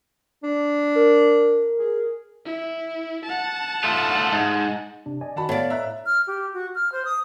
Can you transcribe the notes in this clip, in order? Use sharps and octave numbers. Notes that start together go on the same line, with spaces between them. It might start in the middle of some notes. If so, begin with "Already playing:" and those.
D4
A#4
G#4
E4
F#5 A5
A3 F4
G#2
C3 D4
D5 D#5 G#5
D#3 F#4 F#5 A5 B5
A2 B3 D5 D#5 F5
E5 A#5 F#6
F6
G4
F#4
F6
C5
D#6